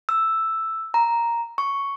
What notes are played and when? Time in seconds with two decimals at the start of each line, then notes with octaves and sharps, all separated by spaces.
0.09 E6
0.94 A#5
1.58 C#6